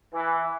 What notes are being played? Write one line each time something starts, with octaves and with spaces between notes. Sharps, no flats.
E3